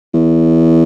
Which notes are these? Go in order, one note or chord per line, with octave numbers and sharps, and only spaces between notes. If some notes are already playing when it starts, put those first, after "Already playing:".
E2